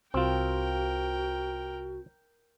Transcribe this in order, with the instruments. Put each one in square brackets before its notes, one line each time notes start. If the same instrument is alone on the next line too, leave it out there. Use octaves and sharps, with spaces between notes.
[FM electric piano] C2 [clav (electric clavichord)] C4 F4 [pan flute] F#4 [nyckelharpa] A#4 G5